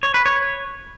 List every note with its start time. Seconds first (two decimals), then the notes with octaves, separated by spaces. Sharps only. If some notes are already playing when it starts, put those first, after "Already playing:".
0.03 C#5
0.14 B4
0.26 C#5